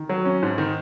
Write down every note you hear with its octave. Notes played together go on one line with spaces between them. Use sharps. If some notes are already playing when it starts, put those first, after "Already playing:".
Already playing: D#3
F#3
C#4
G#2
D#3